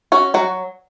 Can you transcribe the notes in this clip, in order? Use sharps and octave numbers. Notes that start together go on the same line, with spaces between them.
C#4 F#4
F#3 F#4